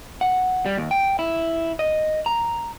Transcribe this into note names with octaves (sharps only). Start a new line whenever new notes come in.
F#5
G3
D#2
G5
E4
D#5
A#5